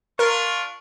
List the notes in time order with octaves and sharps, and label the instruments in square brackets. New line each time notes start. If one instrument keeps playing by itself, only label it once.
[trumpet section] D4 F4 C#6 [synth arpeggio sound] A#4